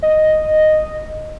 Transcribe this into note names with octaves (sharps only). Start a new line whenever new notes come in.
D#5